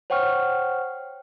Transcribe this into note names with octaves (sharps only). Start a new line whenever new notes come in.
C5 C#5 F#5 G5 C#6 F6